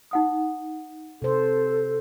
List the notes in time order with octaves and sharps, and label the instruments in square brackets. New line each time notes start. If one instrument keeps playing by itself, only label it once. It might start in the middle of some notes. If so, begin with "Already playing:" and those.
[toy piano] D#4 F#5 D#6
[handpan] C3 C5 [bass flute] A4